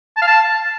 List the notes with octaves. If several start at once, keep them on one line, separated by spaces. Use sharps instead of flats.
A5
F5
A5